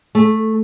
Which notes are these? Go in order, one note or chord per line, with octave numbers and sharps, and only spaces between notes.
A3